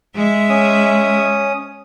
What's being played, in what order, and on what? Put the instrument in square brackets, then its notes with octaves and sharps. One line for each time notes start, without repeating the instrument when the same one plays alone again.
[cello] G#3 E5
[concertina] C#4 D#6